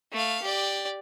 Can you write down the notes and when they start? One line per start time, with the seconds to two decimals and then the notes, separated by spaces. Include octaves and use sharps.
0.12 A3 F5
0.42 G4 D5